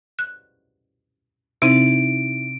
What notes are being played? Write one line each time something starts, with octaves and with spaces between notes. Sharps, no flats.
F#6
C3 C4 D#4 E4 E5 D7